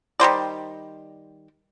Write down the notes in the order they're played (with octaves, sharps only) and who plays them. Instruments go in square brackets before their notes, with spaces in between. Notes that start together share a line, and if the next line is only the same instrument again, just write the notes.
[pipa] D#3 G3 C5 D5